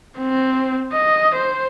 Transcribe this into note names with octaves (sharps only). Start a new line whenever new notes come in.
C4
D#5
C5